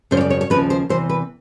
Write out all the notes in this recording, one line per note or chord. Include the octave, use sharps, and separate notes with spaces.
F#2 C#3 F3 C5
C#5
D5
C#5
C#5
D#2 C#3 F3 B4
C5
E2 C3 E3 C5
B4